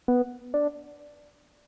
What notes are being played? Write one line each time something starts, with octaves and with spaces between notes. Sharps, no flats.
B3
D4